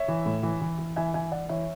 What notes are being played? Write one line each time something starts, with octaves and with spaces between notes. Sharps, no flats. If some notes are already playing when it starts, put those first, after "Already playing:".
Already playing: C#5 E5
E3
A2
E3
E3
E3
E3 E5 G#5
E3 E5 G#5
E3 D5 F#5
E3 C#5 E5